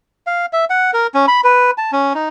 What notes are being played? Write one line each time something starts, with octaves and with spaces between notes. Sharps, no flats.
F5
E5
F#5
A#4
C#4
B5
B4
A5
C#4
D#4